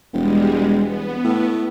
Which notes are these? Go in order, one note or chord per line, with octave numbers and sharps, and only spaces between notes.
E1 G3 G#3
B3
A2